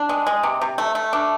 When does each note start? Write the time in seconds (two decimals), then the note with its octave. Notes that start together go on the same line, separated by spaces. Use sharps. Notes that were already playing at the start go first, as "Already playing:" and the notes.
Already playing: D4
0.09 G#3
0.27 G#3
0.43 C3
0.61 C3
0.78 A3
0.95 A3
1.13 D4